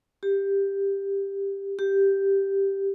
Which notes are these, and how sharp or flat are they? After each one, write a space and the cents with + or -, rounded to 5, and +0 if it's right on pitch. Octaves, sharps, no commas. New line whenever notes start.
G4 +10
G4 +0